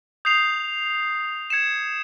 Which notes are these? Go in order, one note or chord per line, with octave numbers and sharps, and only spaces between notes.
D#6 G6 C7 F7
G#6 C#7 E7